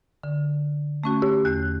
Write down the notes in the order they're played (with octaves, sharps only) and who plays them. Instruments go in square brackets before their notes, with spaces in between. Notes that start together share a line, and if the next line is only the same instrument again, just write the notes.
[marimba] D3
A3 C#4 F#4
[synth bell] G4
[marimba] E2 [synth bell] F#6